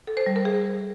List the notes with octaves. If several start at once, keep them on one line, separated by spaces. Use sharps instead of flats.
A4
C5
G3
A#4
G#4